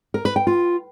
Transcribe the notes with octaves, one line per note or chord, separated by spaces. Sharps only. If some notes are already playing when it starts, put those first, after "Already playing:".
A#4
B4
G5
F4